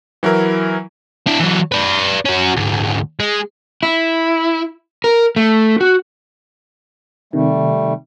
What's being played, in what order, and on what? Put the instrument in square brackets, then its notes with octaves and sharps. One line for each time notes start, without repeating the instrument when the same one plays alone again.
[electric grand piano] E3 F#3 E4 A#4
[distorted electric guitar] D4 E4
E3 F#3
B4 D5
C#4 F#4
D2 G#2
G#3
[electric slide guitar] E4
A#4
A3
F#4
[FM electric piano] C3 D#3 [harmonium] G3 A3